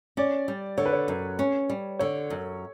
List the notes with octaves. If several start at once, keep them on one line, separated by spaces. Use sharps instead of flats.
C#4 D5
G3
D3 C#5
B4
C#5
F#2
C#4
G3
D3 C#5
F#2